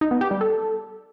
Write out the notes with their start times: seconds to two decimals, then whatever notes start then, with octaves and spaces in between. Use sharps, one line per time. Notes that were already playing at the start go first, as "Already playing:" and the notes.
0.01 D#4
0.11 B3
0.21 G4
0.31 G3
0.41 A4